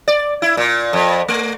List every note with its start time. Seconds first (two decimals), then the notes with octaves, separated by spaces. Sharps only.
0.08 D5
0.42 E4
0.57 A#2
0.93 F2
1.28 A3